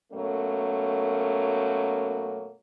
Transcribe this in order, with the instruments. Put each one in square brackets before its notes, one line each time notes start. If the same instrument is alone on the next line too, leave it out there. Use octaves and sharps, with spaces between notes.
[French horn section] F#2 B2 F#3 A3 A#3 C#4